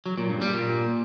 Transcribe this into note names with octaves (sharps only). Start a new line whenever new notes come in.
F#3
A#2
G2
G3
A#2